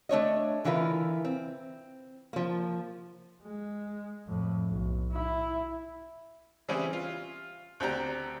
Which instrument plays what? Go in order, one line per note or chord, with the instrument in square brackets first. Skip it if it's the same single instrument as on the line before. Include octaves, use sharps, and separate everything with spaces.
[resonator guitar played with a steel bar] A3 D4 C#5 D#5
D3 E3 E4 F4 A#4 B4
C4
F3 A#3
[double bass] G#3
F2 A2
B1
E4
[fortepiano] E3 G3 C4 C#4 E4 G#4
F4
D2 C4 D4 G4 A#5